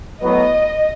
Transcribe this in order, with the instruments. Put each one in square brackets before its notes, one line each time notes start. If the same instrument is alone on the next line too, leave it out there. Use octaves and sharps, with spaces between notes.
[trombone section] A2 F#3 B3 [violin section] D#5